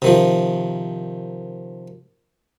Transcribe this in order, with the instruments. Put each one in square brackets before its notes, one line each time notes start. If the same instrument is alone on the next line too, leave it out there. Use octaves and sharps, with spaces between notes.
[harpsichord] C3 D#3 F3